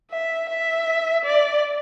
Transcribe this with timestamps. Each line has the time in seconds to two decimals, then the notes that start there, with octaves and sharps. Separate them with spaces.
0.11 E5
0.49 E5
1.25 D5